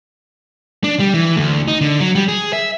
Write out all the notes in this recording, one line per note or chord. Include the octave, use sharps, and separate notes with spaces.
D4
G3
E3
D2
D#4
D3
F#3
G3
G#4
E5